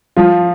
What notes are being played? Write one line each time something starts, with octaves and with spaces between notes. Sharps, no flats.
F3 F4